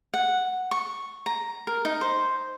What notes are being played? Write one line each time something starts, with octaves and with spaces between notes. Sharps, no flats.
F#5
C#6
A#5
A#4
D#4
C5